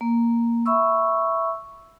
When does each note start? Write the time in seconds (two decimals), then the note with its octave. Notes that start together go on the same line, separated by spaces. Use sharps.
0.01 A#3
0.66 E5 B5 C#6 E6